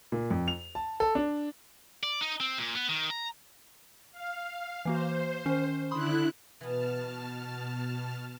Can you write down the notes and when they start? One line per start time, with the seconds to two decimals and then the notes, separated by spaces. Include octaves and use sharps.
0.12 A#2
0.30 F2
0.48 F7
0.75 A5
1.00 A4
1.15 D4
2.03 D5
2.21 D#4
2.40 C4
2.58 A#2
2.75 B3
2.89 D#3
3.10 A#5
4.12 F5
4.85 E3 A#3 F#4 C5
5.45 D#3 C#4 C7
5.91 D3 E4 B5 C6 D#6 F#6
6.61 B2 E3 B3 A5 F6